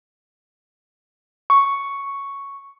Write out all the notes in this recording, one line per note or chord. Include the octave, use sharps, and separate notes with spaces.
C#6